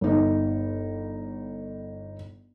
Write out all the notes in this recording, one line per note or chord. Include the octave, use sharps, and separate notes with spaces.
G1 D#4